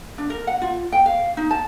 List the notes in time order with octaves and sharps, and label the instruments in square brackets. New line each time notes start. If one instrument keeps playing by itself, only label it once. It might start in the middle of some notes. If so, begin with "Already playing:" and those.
[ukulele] D4
A#4
F#5
F4
G5
F5
D#4
A5